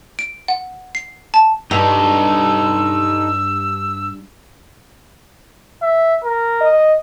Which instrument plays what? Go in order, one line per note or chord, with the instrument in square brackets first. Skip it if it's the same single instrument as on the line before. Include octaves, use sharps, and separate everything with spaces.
[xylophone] D7
F#5
C7
A5
[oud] G2 [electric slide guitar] D#4 A4 [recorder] E6
[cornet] E5
A#4
[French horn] D#5